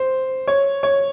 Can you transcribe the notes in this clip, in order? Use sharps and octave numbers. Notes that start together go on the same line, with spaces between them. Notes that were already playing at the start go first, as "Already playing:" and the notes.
Already playing: C5
C#5
C#5